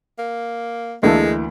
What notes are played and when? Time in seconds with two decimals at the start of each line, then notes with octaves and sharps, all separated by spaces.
0.18 A#3
1.03 D2 E3 G#3 A#3 D4 A4